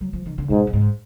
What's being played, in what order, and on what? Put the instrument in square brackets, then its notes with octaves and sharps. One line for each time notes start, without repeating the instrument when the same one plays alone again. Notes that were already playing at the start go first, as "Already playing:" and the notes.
[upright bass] F#3
F3
D#3
D3
[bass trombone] G#2 [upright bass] B2
[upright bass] F#2
G#2